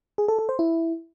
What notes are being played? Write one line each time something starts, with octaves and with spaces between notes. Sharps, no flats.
G#4
A4
A4
C5
E4